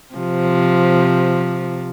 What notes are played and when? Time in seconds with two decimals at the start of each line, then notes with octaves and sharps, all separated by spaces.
0.15 C3 F3